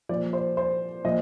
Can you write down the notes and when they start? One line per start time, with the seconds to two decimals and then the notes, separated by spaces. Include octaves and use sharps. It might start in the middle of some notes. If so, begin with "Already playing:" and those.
0.09 A#2 F3 D5
0.33 C5
0.57 C5
1.04 A#2 F3 D#5